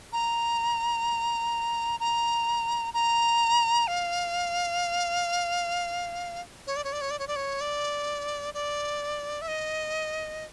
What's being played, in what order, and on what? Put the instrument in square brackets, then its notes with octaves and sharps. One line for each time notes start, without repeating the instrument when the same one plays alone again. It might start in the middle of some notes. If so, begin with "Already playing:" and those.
[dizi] A#5
A#5
A#5
F5
C#5
D5
C#5
D5
C#5
D5
C#5
D5
C#5
D5
D5
E5
D#5